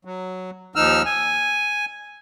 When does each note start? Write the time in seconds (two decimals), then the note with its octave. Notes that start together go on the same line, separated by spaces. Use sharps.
0.05 F#3
0.76 D#2 F3 D#4 E6 F6
1.06 G#5